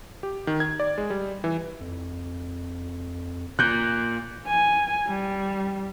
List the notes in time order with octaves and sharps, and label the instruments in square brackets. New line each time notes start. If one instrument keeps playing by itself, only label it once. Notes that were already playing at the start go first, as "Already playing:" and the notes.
[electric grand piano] G4
D#3
G#6
D5
G#3
G3
E3
[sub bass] F2
[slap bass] A#2 [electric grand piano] F#6 G6
[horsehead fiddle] G#5
G3